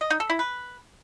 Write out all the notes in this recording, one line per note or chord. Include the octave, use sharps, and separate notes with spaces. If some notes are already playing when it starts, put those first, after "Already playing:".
D#5
D#4
A4
E4
B4